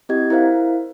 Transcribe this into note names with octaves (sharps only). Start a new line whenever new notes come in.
C4 E4 G4 D#5 G#6
E4 A#4 C5 F5